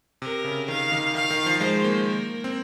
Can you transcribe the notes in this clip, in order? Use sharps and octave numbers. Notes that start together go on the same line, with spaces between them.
C3 A#4
C#3
D#3 F5
D#3
D#3 F5
D#3
F3
G#3 C5
A#3
A#4
C4